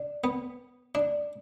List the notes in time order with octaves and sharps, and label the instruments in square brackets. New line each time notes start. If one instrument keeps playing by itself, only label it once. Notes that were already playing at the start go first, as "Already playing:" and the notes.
Already playing: [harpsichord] D4
B3
D4